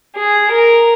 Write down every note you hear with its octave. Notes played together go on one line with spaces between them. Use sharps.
G#4
A#4